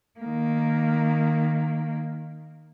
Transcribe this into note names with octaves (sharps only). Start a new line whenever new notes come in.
D#3 A#3